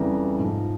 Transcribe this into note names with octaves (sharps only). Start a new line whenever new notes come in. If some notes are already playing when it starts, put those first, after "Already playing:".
Already playing: F2 C#3 E3 G3 A#5
G#2 F3